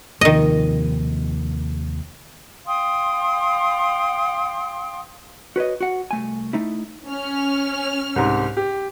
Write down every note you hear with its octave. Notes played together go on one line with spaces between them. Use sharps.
D#2 C3 D#3 F3 D#5
F5 G5 C6 D#6
F#4 B4 C#5 D#5
F#4 F#5
C2 A3 G#5
A3 D#4 E4
C#4 F6
C2 G#2
G4